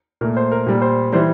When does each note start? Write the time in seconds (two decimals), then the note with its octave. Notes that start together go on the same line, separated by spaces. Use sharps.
0.21 A#2 A3 A#4
0.37 C5
0.52 A#4
0.66 A#2 G3
0.82 C5
1.12 E3 G3 C5